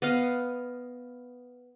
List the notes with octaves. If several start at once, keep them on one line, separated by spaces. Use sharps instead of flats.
B3 D#5 F5